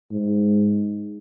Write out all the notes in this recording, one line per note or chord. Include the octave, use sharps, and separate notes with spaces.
G#2